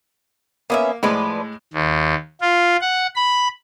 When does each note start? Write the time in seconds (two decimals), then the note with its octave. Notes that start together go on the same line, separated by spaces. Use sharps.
0.70 A#3 B3 C#4 E5
1.03 A2 F3 G#3 B4 D5
1.73 D#2
2.41 F4
2.81 F#5
3.16 B5